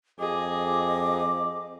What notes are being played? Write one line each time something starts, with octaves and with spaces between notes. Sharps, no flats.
F2 G#4 D#5 D6